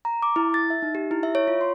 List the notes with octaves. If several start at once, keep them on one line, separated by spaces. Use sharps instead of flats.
A#5
D6
E4
A6
E5
D#4
G4
E4
E5
C#5
F4
C6